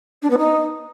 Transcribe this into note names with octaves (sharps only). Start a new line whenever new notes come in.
D4
B3
D#4